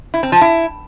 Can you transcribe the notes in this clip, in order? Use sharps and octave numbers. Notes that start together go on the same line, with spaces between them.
E4
C4
F3
E4